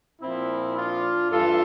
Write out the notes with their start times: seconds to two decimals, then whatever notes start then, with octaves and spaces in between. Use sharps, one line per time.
0.21 A#2 F3 C4 E4
0.75 D4 F4
1.30 G2 E3 F4 A4